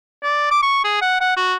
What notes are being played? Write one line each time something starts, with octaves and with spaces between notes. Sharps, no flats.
D5
D6
C#6
G#4
F#5
F#5
F#4